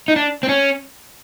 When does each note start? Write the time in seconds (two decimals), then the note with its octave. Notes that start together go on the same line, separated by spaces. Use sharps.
0.08 D#4
0.16 D4
0.43 C4
0.49 C#4